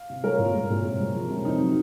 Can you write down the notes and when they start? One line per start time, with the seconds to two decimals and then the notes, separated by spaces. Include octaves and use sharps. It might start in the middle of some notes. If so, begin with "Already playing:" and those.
Already playing: F5
0.10 C3
0.24 G#3 A#4 C#5
0.39 A#2
0.55 G#3
0.70 A#2
0.85 C3
0.99 G#3
1.15 F3
1.31 C3
1.45 F2 D#4
1.60 F#3